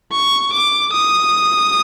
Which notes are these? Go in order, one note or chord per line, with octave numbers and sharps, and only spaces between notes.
C#6
D6
D#6